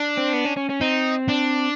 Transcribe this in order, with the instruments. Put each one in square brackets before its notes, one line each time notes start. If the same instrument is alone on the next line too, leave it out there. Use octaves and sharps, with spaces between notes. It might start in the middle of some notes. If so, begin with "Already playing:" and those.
Already playing: [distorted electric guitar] D4
[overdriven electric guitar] C4
B3
C#4
C#4
C#4
[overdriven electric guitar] C4 [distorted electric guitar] D#4
[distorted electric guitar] D4